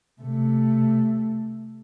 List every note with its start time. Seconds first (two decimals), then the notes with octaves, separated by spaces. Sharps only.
0.21 C3 A3